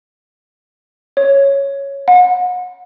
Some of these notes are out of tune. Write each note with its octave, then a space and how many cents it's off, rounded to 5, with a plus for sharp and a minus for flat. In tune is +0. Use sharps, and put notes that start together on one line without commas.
C#5 +0
F#5 -35